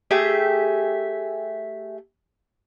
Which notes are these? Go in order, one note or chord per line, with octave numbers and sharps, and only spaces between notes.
A3 G4 G#4 E5